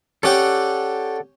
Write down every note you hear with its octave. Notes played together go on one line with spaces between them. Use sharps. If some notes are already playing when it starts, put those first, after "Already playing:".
C#4 G4 A4 D5 F#5 G5